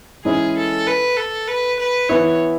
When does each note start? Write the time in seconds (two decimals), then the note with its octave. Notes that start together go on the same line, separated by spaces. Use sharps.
0.25 E3 G#3 C#4 E4 G#4
0.57 A4
0.87 B4
1.17 A4
1.48 B4
1.79 B4
2.09 E3 B3 E4 C#5